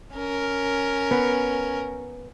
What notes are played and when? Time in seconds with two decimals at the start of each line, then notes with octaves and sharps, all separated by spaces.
0.15 C#4 A#4
1.11 B3